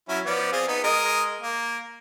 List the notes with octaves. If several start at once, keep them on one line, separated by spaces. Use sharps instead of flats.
F#3 C#4 E4
F3 B3 D5
C4 F4 G#4
B3 D#4
G#3 A#4 D#5
A#3